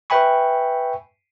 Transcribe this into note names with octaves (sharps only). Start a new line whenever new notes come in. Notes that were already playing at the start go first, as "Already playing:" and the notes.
B4 E5 G5 G#5 B5 C#6